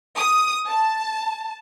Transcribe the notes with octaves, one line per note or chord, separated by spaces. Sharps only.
D#6
A5